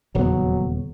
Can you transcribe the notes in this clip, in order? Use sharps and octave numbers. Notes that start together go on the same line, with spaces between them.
D#1 E2 C#3 F#3 B3